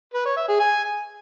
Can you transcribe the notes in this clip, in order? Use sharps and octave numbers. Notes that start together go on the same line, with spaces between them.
B4
C#5
E5
G#4
G#5